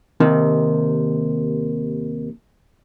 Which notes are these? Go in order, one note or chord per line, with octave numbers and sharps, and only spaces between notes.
D#2 C3 D#3